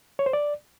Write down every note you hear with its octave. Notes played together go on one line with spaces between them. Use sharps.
C#5
C5
D5